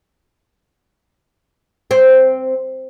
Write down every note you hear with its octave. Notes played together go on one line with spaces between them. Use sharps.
C4